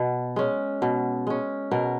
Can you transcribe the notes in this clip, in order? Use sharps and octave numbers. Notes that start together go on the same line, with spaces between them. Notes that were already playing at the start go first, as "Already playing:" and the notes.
Already playing: B2
G#3 C#4
B2
G#3 C#4
B2 A#4